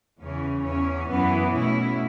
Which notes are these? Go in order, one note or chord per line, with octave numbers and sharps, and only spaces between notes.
E2 C#3 E3 C#4
E2 E3 C#4
F#2 E3 B3
B2 A3 C#4 E4